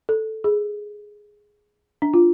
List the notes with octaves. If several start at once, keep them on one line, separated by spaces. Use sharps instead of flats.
A4
G#4
D4
F4